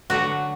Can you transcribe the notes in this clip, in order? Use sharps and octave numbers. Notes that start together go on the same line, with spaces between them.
D3 F#3 A3 F#4